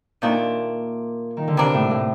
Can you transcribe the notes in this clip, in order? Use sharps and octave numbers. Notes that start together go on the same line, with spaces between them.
A#2 D#3 A3 D4
D#3
D3
C3 G3 A#3 D4
A2
A2